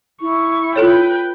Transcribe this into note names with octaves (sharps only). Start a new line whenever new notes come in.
E4 C#6
F4 A4 B4 C#5 G5